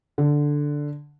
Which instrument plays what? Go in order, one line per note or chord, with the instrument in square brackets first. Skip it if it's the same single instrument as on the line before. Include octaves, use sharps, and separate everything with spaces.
[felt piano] D3